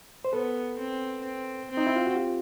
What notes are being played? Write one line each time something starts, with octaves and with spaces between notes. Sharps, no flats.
C5
B3 A4 B4
C4
C4
C4
D#4
E4
F4
F#4
F4 G4